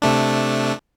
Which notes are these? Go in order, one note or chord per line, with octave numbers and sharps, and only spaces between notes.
C3 A3 D4